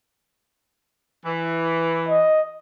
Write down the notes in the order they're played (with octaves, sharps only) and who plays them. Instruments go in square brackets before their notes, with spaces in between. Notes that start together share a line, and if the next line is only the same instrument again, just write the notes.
[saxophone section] E3
[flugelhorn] D#5